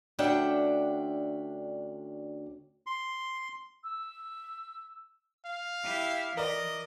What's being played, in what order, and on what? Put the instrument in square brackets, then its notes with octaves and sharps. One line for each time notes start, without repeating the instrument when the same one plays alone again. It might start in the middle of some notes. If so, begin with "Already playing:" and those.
[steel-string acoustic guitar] D2 C#4 D4 E5 F#5 G5
[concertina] C6
[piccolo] E6
[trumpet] F5
[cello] E4 [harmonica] G4
[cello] E3 [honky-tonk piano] A#4 D5 [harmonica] D#5